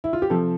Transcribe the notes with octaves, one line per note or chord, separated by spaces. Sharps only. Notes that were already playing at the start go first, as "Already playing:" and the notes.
E4
F4
G4
C3 F3 A4